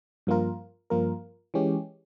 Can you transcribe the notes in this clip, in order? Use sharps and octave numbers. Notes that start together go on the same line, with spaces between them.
G2 F3 A#3 F4 A#4
G2 F3 A#3 F4 A#4
E3 G#3 C#4 G4